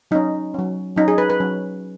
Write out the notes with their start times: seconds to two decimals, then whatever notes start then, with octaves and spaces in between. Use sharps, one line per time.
0.11 F#3 C#4 D#4
0.54 F#3 C#4
0.96 F#3 C#4 D#4
1.08 G#4
1.18 B4
1.30 B4
1.40 F#3 C#4